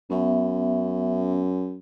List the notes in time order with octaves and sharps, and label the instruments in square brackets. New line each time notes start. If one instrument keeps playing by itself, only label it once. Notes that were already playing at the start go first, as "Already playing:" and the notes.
[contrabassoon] F#2 [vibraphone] B3 C#4 E5